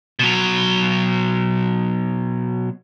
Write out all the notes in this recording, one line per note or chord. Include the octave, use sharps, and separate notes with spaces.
B2 F#3